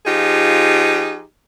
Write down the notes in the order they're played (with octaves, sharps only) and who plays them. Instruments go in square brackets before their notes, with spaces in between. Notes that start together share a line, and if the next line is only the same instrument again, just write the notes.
[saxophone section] F3 D#4 F4 G4 G#4